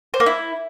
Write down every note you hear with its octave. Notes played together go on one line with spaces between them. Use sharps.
C5
A#3
E4